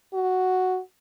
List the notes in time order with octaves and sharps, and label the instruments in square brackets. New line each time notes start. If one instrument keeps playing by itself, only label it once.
[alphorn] F#4